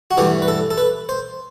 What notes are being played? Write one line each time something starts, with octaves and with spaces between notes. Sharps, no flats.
F#4
G2 E3 A3 G4
B4
A4
A4
B4
C5